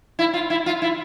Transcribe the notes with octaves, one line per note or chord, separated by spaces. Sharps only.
E4
F4
E4
F4
E4